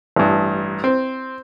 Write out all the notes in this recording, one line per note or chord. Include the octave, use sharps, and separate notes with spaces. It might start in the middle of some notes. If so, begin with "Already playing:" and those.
A1 G2
C4